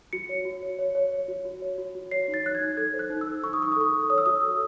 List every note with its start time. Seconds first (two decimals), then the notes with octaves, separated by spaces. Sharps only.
0.13 F#4 C#7
0.29 C#5
0.45 F#4
0.62 C#5
0.79 C#5
0.95 C#5
1.12 C#5
1.28 F#4
1.45 F#4
1.62 C#5
1.78 F#4
1.95 F#4
2.11 C#5 C7
2.28 D#4
2.34 A6
2.44 C#5 F#6
2.55 G#6
2.61 D#4
2.77 A4 G#6
2.94 C5
2.99 F#6
3.10 D#4
3.21 E6
3.27 A4
3.43 D#4 C#6
3.53 D#6
3.60 D#4 C#6
3.72 D#6
3.77 A4 C#6
3.93 A4
4.10 C#5 D#6
4.18 E6
4.26 F#4 D#6
4.43 A4